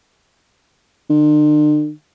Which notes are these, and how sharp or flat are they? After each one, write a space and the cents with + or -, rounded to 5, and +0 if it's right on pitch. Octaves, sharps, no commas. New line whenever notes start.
D3 +45